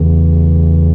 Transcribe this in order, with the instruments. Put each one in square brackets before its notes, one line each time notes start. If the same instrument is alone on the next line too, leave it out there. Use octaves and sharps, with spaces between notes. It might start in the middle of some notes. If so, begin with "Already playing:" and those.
Already playing: [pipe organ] E2 C#3 E3